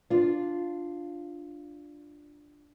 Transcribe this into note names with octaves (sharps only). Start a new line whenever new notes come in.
D4 F4